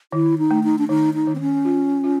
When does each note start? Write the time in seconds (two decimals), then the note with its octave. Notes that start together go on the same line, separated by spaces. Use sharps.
0.13 D#3 E4
0.38 D#4
0.51 A3
0.64 D#4
0.78 D4
0.89 D#3 D#4
1.14 D#4
1.27 D#3
1.35 C4
1.41 C#4
1.65 F4
2.04 F4